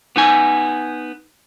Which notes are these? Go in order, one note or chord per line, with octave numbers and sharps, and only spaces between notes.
B3 D#4 G#5